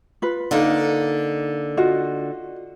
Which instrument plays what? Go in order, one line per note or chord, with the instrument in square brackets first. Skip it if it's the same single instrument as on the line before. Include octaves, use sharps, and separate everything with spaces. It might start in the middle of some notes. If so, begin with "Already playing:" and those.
[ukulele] F4 B4
[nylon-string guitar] D3 A#3 D#4
[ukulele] F4 F#4 D#5